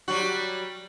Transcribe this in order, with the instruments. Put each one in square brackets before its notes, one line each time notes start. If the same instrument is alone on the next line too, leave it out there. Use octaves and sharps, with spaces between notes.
[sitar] F#3 G3 F#4